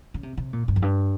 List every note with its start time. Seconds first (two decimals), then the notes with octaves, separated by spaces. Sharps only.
0.14 C#3
0.23 C3
0.37 C3
0.53 A#2
0.68 G2
0.76 F2
0.82 G2